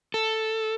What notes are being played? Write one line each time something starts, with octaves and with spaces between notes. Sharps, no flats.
A4